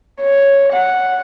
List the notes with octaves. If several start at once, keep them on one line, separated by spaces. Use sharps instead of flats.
C#5
F#5